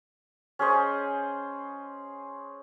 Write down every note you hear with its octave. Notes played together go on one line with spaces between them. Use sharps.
C#4 G#4 C5 D#5